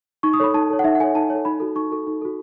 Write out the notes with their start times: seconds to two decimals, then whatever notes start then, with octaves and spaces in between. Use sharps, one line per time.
0.23 D#4 C#6
0.33 D#6
0.40 A4 C#5 B5
0.54 D#4 A5
0.70 A4 C#5
0.79 F#5
0.84 D#4 E5
0.95 F#5
1.00 A4 C#5 G#5
1.15 D#4 A5
1.30 A4 C#5
1.45 D#4 B5
1.60 F#4 A4
1.75 D#4 C#6
1.91 F#4 A4
2.07 D#4
2.21 F#4 A4